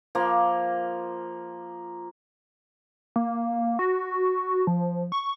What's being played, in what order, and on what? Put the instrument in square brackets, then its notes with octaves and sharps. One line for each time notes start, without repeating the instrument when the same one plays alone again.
[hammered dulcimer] F3 A#3
[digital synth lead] A#3
F#4
F3
C#6